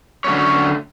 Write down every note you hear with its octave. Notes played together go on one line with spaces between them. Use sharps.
D3 F#3 A3 C#4 C#5